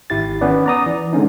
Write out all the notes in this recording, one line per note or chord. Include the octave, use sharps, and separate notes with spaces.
G#1 E4 G4 A6
D#3 B3 C#4 B4 D5
D5 A#5 D#6
E3
D3 G#3 B3 C#4 D#4